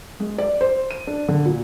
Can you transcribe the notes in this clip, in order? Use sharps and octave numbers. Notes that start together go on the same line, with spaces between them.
G#3
D5
C5
D#7
D4
D3
A#2